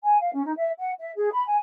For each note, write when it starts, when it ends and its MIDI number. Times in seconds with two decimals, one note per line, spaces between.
0.03 0.20 80
0.20 0.33 77
0.33 0.41 61
0.45 0.52 63
0.57 0.70 76
0.78 0.91 78
0.98 1.11 76
1.15 1.29 68
1.32 1.44 83
1.47 1.56 80